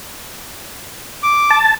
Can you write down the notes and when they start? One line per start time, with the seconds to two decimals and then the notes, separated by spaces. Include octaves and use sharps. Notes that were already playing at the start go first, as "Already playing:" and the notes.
1.23 D6
1.50 A5